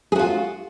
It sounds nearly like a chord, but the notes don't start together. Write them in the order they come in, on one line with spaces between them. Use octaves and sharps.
G#4 F#4 F4